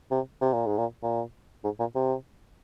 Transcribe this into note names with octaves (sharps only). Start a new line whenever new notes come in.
C3
C3
A#2
G#2
A#2
A#2
G#2
A#2
C3